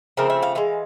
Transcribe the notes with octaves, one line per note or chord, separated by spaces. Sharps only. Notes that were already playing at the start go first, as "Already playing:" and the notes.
C#3 F3 A3 C4 A#4
E5
F5
E3 G#3 F5